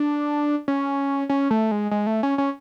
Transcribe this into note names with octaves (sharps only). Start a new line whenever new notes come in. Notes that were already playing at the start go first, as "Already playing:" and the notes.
Already playing: D4
C#4
C#4
A3
G#3
G#3
A3
C#4
C#4